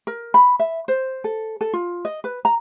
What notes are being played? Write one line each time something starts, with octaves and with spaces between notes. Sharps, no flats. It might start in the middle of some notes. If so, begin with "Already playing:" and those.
A#4
B5
E5
C5
A4
A4
F4
D#5
B4
A#5